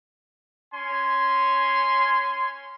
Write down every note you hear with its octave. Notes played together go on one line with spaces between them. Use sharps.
C#4 G#5 C6